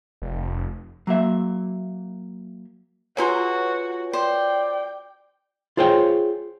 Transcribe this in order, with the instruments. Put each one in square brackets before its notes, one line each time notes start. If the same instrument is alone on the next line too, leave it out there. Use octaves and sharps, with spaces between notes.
[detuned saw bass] F1
[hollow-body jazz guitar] F#3 A#3 E5
[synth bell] F4 B4 C#5 [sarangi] F#4 [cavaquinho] G#4 A#5 C6
[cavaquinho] C5 [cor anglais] D5 [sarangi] G5
[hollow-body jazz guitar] F4 G#4 C5 C#5 G5